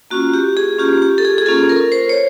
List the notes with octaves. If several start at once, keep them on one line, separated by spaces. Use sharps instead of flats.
A#3 C#4 F4 F#4
G4
G#4
A#3 C#4 F4 G4
G4
A4
G#4
G#4
A#3 C#4 F4 A4
A#4
C5
C#5